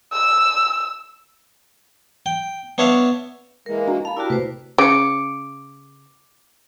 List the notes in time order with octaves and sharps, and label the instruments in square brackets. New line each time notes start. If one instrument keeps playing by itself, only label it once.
[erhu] E6
[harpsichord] G5
B3 D4 C#5 E5 F5
[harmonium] E3 G#3 A#3 [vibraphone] A#4
[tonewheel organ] D4 F#4 [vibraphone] A#5
[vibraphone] F5 B5 [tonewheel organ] A5
[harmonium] D4 G4 A#4 [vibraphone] E4 F#4
[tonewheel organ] C3 A3 [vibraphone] B4 C5
[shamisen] C#3 [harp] D6 C#7